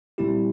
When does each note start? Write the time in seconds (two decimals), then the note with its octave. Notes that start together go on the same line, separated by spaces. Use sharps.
0.18 A#2 G3 C4 E4 G4